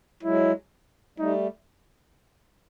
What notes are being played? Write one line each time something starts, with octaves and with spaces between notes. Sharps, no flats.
F#3 G#3 E4
G3 A3 D#4